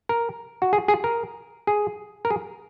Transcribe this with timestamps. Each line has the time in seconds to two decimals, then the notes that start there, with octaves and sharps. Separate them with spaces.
0.09 A#4
0.62 F#4
0.73 G#4
0.88 G#4
1.04 A#4
1.67 G#4
2.25 A#4
2.30 G#4